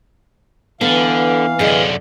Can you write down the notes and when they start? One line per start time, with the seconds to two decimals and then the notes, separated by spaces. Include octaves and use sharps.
0.81 D3 E3 B3 F5
1.59 F#2 D3 G#4 D#5